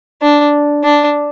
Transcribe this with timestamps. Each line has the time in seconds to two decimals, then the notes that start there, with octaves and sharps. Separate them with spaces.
0.22 D4
0.84 D4